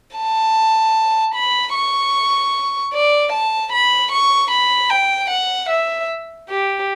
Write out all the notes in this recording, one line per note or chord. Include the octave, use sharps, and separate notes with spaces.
A5
B5
C#6
D5
A5
B5
C#6
B5
G5
F#5
E5
G4